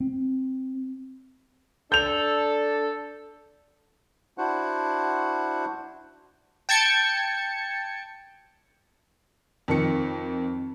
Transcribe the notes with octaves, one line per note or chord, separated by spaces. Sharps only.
C4
D4 A4 G6 F7
D4 E4 F#4 C5 F#5
G5 A5 G#6 C#7
F2 D#3 C#7